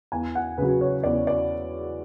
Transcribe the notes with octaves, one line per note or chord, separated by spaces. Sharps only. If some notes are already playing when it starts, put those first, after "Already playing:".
E2 G#5
F#5
C#3 F#3 B4
C#5
E2 D5
D5